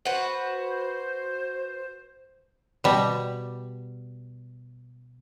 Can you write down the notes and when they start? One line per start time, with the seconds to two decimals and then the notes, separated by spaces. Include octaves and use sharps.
0.05 F#4 B4 C5
2.84 B2 G3